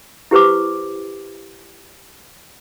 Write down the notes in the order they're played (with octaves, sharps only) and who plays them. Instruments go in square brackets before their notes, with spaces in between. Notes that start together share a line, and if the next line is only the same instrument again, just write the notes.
[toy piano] E4 G4 B4 C5 D6